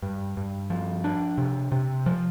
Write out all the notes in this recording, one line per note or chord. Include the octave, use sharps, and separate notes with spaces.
G2
G2
F3
D4
C3
C3
F3